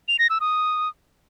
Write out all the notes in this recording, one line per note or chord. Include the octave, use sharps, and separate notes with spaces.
F7
A#6
E6
D#6